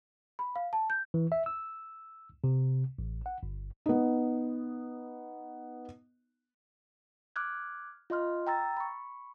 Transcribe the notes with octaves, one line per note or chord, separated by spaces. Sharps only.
B5
F5
A5
G6
E3
E5
E6
C3
A1
F#5
G1
B3 D#4
D6 F6 F#6 G#6
F4 D#5 C6 F6
G5 A#5 E6 A6
B5 C#6